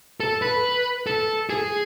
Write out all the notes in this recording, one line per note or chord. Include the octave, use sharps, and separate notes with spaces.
A4
B4
A4
G#4